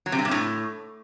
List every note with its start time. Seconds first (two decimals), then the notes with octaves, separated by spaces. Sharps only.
0.06 F#3
0.12 C3
0.19 G2
0.25 C3
0.31 A2